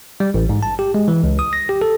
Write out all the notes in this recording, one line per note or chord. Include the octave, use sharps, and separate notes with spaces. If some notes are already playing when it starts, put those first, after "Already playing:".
G3
A1
G#2
A5
G4
G#3
E3
C#2
D#6
A#6
G4
A4